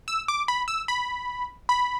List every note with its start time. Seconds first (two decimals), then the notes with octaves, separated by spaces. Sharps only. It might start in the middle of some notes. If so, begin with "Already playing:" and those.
0.08 E6
0.28 D6
0.48 B5
0.68 E6
0.88 B5
1.69 B5